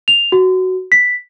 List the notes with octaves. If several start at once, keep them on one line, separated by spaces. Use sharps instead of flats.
F7
F#4
B6